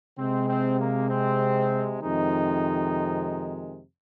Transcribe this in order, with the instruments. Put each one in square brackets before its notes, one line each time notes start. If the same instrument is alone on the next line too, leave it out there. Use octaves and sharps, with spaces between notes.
[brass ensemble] C3 G#3 C4
C4
A#3
C4
F2 C3 D#3 G#3 D#4